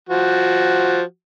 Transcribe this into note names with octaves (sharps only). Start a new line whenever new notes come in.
F3 F#4